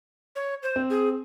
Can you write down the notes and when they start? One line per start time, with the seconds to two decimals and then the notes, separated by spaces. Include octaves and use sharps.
0.36 C#5
0.63 C5
0.76 C4
0.90 G#4